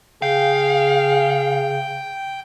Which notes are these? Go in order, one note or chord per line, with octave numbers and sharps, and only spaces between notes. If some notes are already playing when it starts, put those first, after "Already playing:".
C#3 G#4 F5 G5